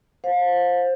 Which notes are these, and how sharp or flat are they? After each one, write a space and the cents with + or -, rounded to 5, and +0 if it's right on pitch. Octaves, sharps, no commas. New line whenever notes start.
C5 +15 F5 +30